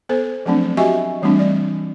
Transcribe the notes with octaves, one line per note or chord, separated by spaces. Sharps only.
B3 A4 C5
F3 F#3 A3 C4 D4
F#4 G4 D#5 E5 G#5 C#6
E3 G3 A3 C4 D4
D5